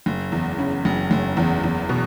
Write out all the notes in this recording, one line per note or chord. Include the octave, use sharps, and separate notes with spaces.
F#1
E2
C#3
F#1
F#1
E2
E2
B2